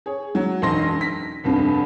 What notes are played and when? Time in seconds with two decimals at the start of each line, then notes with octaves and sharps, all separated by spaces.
0.06 G#4 C#5
0.35 F#3
0.62 E1 B1 F#2 D#4 C6 A#6
1.01 B6
1.44 F1 C2 G2